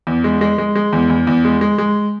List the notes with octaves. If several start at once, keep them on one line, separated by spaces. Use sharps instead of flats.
E2
G#3
G#3
G#3
G#3
E2
E2
E2
G#3
G#3
G#3